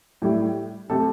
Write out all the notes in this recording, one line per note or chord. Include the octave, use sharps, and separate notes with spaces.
A2 G3 E4
C3 A3 C4 A4